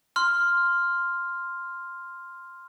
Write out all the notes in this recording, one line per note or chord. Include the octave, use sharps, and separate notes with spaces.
C6 F6